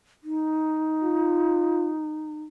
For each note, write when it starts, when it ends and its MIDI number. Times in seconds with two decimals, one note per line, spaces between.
0.23 2.42 63
1.03 1.92 65